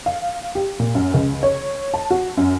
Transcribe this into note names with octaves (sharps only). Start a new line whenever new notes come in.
F5
G4
A#2
F#2
C#2
C#5
A5
F#4
F#2